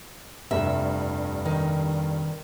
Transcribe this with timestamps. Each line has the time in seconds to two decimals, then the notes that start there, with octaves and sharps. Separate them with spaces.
0.51 F1 G2 E5
1.46 D#3